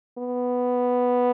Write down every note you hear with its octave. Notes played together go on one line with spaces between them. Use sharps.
B3